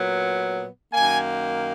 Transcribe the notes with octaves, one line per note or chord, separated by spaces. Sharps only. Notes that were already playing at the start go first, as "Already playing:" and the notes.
Already playing: A#2 F#3 B3
F#2 D#3 A#3 G#5